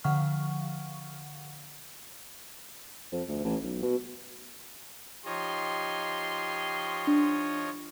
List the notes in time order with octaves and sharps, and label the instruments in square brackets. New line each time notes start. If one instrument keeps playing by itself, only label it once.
[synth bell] D3 F3 F5 F#5 C#6 F6
[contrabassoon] F2
D2
A1
B1
B2
[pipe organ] F3 C#5 D#5 [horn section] D#4 G4 C6
[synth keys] D4